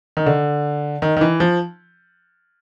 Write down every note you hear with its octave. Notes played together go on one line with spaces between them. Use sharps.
D#3
D3
D#3
D#3
E3
F3